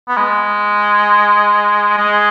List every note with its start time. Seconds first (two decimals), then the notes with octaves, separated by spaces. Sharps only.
0.09 B3
0.17 G#3
1.98 G#3